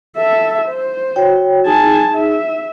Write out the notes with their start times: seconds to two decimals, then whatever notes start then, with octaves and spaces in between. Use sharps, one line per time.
0.17 A4 E5
0.68 C5
1.16 F#4 C#5 G5
1.66 D#4 G#4 G#5 A5
2.15 E5